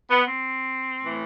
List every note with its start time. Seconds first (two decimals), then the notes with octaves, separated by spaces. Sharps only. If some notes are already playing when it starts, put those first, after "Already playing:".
0.10 B3
0.28 C4
1.01 A2 E3